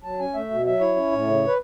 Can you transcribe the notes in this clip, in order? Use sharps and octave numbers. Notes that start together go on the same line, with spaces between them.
F#3 A5
C#4 G#5
A3 E5
B2
F#3 E5
E4 C#5
C#4
A2
C#3
B4